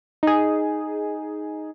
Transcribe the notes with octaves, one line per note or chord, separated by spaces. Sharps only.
D#4 G#4